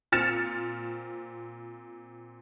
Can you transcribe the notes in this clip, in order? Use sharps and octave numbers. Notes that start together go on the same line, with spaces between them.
A#2 C4 F6 A6 C#7 E7